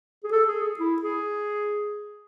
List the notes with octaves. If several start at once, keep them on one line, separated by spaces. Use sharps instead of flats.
G#4
A4
G#4
G#4
E4
G#4